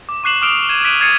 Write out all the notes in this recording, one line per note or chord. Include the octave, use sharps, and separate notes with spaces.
D6
C#6 D6 F#6 C7 E7 F#7
D6 D#6 F6 C7 D7 F7
G#6 D#7 E7
F#6 B6 D7 D#7 F#7
D#6 G#6 A6 C7 C#7 D#7